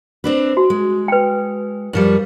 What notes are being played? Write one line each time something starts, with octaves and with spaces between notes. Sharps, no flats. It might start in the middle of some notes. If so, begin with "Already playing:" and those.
C4 D4 B4
F#4
G#3
B4 G5
F#2 F3 G3